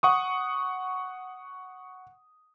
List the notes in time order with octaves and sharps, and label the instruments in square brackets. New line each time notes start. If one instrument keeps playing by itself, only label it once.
[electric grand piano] F#5 C#6 D#6